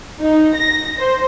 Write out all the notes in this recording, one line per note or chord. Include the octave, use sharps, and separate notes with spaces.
D#4
A#6
C5